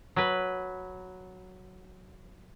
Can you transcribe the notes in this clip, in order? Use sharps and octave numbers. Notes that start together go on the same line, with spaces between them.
F#3 B4